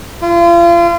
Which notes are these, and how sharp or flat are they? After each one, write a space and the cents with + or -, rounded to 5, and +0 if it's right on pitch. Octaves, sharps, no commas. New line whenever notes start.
F4 -35